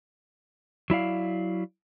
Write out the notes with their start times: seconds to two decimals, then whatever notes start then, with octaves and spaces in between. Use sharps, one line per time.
0.90 F#3 E4 D5 F5